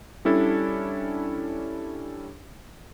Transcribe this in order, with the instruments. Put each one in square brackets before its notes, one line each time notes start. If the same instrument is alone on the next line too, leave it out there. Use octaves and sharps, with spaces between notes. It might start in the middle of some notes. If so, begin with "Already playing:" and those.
[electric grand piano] G3 C#4 D4 E4 A4